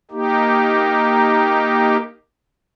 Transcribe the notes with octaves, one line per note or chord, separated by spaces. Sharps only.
A#3 D#4 G4